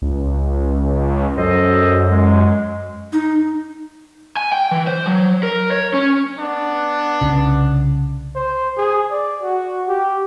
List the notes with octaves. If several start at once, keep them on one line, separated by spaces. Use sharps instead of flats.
C#2
F#2 A4 C5 D#5
G#3
D#4
G#5
G5
E3
C5
F#3
A#4
C#5
C#4
B3 D4
C2 C#3
C5
G#4
D5
F#4
G4